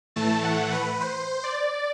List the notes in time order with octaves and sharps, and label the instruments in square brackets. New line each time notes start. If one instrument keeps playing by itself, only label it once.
[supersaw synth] A2 E3 A3 A5
F#5
B4
C5
D5